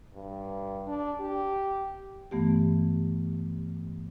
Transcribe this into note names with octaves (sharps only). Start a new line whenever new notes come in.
G2
D4
G4
G2 E3 A3 B3 G4